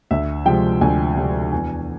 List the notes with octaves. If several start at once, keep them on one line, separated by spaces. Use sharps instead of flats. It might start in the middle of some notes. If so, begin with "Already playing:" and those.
D2 E5
C3 F3 G#3 G5
D2 G#5
C3 F3 G#3
E2 G#5